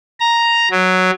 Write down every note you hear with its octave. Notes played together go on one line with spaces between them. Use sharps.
A#5
F#3